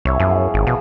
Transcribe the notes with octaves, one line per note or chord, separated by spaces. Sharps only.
C2 E4 C#5
F#2 F3 B3 G#4
G#1
B2 F3